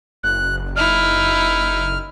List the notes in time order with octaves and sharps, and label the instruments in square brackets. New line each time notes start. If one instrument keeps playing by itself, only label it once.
[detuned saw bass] F#1 [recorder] F#6
[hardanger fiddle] D#4 E4 [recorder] F6